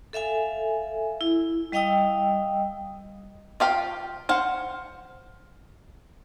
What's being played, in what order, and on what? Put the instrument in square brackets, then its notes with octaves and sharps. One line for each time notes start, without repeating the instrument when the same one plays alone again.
[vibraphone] A4 E5 F5 G#5
E4
G3 D#5 F5 G5 D#6 E6
[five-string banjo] F4 G4 F5
C5 F5 F#5